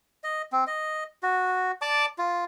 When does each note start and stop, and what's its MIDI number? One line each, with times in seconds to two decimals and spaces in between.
0.24 0.42 75
0.52 0.64 60
0.67 1.04 75
1.23 1.72 66
1.82 2.06 74
1.82 2.06 81
1.82 2.06 86
2.18 2.45 65